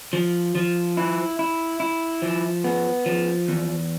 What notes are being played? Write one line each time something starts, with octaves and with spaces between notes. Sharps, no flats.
F3
F3
E4
E4
E4
F3
B3
F3
E2